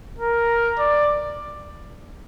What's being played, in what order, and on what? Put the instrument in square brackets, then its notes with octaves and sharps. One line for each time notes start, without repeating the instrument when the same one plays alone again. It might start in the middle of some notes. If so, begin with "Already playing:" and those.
[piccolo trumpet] A#4
D5